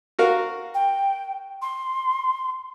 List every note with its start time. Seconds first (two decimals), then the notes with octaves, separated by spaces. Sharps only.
0.19 F#4 A#4 F5
0.74 G5
1.62 C6